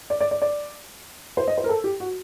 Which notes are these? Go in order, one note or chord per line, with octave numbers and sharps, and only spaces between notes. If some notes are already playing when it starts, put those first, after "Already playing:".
D5
D5
D5
D5
C5
D#5
C5
A#4
A4
G4
F#4